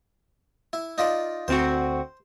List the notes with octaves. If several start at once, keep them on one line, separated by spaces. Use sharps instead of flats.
E4
D#4 F4 D5
D2 C4 F#4 C5